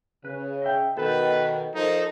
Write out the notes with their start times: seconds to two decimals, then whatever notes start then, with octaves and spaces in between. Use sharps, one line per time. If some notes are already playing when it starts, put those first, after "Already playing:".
0.25 C#3 B4
0.62 D#5 E5 G5
0.98 B2 D#3 A4 B4 G5
1.75 F3 D#4 A4 A#4